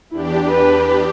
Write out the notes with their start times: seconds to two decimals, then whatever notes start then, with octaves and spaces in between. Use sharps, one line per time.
0.12 E2 D4 E4 G4
0.48 B4